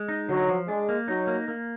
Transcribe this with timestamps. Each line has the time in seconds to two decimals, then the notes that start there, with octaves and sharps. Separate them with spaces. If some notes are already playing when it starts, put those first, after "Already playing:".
Already playing: G#3
0.08 D#4
0.29 D3 F#3
0.49 F3
0.68 G#3 D4
0.89 A#3
1.08 F#3 D#4
1.27 A#3
1.48 A#3